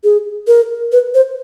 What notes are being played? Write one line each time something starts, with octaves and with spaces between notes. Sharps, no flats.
G#4
A#4
B4
C5